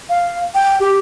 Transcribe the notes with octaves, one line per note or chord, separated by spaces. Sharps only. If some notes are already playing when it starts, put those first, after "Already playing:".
F5
G5
G4